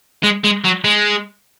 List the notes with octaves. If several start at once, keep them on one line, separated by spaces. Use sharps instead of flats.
G#3
G#3
F#3
G#3